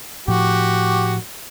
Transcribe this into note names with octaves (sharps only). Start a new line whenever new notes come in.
A2 F3 F#4 G4